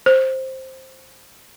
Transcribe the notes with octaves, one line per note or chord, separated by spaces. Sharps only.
C5